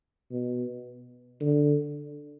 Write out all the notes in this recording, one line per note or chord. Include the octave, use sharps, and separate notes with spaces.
B2
D3